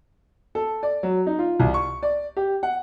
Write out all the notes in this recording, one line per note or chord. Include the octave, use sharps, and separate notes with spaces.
A4
D5
F#3
D#4
F4
C2
C#6
D5
G4
F#5